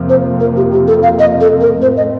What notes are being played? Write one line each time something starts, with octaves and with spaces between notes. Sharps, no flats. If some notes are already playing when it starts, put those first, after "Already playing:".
Already playing: F2 C3 F3 A#3
C5
A#4
G4
G4
A4
F5
D#5
A4
A#4
A2 A3 C4 C5
D#5